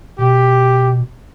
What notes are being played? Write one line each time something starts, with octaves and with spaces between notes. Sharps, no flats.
B2 G4